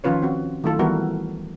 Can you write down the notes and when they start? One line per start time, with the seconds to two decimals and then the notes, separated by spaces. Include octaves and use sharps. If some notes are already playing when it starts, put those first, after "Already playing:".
0.04 D#3 F3 C#4 F4 B4 C#5
0.22 C4 F#4
0.64 D#3 F#3 A3 E4 F4 A4
0.79 E3 G3 B3 E4 F#4 A#4